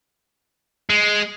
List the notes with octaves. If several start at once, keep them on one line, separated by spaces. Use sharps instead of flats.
G#3